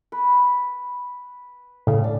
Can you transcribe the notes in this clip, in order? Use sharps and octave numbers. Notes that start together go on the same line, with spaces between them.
B4
A2 C#3
D4